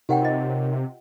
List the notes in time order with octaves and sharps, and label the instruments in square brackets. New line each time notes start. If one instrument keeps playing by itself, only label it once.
[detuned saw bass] C3 [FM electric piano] D#4 A#4 C#5 [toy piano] G4 F#5 G5
[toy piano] F4 D#5